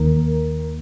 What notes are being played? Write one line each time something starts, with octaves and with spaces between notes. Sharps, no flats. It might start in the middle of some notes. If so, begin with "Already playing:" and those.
Already playing: D#2 D#3 A#3 A#4